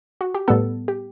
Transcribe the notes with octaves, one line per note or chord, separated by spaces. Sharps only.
F#4
G4
A2 G3 B3 A4
G4